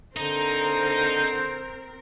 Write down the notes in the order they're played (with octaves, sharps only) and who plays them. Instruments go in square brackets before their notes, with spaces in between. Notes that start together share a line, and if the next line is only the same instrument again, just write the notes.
[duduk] D3 [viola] C4 A#4 [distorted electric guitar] D#4 [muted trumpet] C5